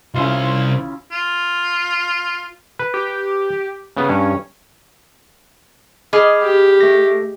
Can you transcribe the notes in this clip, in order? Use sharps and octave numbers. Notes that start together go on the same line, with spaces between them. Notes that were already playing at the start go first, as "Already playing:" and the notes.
C2 C#3 E4 F4 C5
F4
B4
G4
C#3 B3
G2 C#4
G#4 D#5 B5 D6 F6
G4
A3 A#6